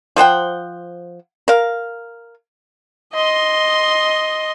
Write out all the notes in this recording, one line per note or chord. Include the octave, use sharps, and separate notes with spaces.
F3 C5 F#5 G5
A#4 F5
D#5 C6